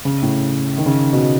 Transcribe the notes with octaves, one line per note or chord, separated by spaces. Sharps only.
C#3
A2
D#3
C#3
B2